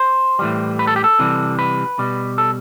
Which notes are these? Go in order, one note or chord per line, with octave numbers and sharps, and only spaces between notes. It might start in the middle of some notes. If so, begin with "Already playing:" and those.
Already playing: C5
A2 E3 G3
B4
A4
G4
A4
C3 E3 G3
B4
B2 G3
A4